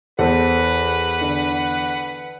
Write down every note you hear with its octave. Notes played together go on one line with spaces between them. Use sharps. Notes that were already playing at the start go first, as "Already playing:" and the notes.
E2 A4 B4 C5 F#5
D3